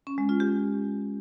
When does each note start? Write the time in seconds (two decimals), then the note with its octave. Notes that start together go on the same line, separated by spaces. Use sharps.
0.07 C#4
0.18 G#3
0.29 F4
0.40 G4